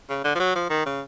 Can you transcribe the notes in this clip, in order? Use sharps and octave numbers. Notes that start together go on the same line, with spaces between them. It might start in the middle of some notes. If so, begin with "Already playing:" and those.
C#3
D3
F3
F#3
F3
D#3
C#3